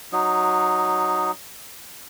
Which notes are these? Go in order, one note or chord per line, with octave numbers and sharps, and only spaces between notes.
F#3 D#4